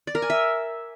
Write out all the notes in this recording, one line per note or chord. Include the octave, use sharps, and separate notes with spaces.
D5
A#4
G#5
E5